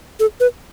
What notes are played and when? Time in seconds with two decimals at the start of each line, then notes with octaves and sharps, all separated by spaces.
0.20 A4
0.40 B4